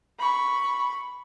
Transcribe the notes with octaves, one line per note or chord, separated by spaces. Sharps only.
B5 C#6